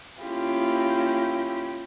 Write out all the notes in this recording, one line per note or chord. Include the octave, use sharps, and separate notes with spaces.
A#3 C#4 E4 F4 G4